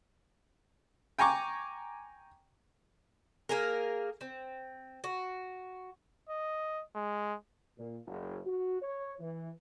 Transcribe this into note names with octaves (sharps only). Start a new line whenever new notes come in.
G5 G#5 A#5 C#6 D6
A#3 G#4 A#4
C4
F#4
D#5
G#3
A#2
F#1
F#4
C#5
E3